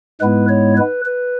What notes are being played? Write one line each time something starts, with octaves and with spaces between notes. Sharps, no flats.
G#2 G#3 B3 E4 B4
C#5
B4
B4